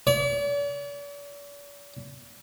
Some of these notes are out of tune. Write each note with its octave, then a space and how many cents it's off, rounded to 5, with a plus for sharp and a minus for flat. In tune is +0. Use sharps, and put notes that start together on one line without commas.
D5 -45